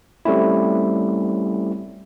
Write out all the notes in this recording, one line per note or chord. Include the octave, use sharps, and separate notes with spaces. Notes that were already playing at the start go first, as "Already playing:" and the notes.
G3 A3 C4 C#4 E4